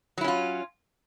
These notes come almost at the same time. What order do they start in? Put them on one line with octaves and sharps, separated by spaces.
F#3 E4 C#4 F4